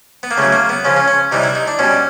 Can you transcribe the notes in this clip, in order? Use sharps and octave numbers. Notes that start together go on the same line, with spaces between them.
B3
A#3
C#3 F#3 A3
A#3
B3
C#3 F3 C#4
C#4
C#4
C3 E3 G3 D#4
E4
D#4
D4
B2 G3 C#4